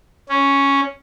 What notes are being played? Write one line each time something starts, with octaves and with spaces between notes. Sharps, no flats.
C#4